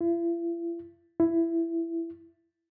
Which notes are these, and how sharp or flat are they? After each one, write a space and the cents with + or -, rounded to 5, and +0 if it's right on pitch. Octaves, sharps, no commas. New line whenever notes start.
E4 +45
E4 +15